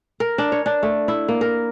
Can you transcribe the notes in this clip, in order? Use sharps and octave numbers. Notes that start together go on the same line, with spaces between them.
A#4
D4
C#5
D4
A3
E4
A#3
A#4